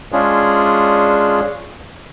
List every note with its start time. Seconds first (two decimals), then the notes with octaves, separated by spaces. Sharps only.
0.12 G#3 C#4 D4 F4 G#4